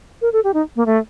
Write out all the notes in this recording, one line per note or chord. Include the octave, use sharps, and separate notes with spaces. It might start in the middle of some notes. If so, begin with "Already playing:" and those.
A#4
A4
G4
D#4
A#3
A3